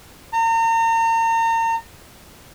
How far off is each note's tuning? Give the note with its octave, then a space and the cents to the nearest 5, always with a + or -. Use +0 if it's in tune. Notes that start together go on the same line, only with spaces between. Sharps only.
A#5 -35